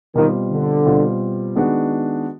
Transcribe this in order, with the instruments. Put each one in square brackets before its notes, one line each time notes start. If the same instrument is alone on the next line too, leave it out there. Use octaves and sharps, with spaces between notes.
[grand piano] B2 G3 C4 F4 [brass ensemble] D#3
[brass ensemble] D3
[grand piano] B2 G3 C4 F4
D#3 G#3 B3 D4 F#4